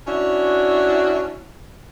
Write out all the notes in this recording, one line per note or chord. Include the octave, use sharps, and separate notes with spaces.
C#4 D4 E4 F#4